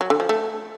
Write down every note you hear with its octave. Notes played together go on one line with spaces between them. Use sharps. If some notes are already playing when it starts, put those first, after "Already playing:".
F#3
D3
F3
A3